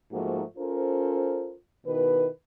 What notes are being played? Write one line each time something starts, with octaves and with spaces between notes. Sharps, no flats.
G#2 F3 A3 A#3 D#4 F#4
C#4 F4 A4 A#4 C5
B2 D#3 E4 B4